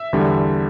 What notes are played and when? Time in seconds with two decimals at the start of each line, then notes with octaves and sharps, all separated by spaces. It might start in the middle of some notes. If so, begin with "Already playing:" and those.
Already playing: E5
0.13 E2 D3 G3